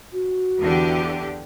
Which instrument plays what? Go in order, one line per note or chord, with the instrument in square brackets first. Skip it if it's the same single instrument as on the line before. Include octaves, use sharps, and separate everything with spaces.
[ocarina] F#4
[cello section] E2 D3 G4